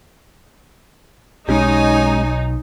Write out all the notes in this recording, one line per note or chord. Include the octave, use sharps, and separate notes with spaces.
B1 G#3 C#4 D#4 G4 C#5 G#5